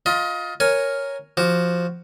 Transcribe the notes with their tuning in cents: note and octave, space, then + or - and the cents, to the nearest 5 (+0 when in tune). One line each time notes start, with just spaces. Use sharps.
F4 +15 D#5 +25 A#5 +45
A#4 +0 C#5 +0 G#5 +0
F3 +0 F#4 +10 D6 +0